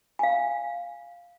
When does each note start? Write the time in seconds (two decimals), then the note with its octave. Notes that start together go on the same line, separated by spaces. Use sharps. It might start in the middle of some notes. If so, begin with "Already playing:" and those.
0.19 F5 G#5